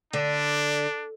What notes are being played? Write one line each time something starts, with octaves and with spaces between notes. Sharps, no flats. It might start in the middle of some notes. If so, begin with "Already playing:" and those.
D3 D4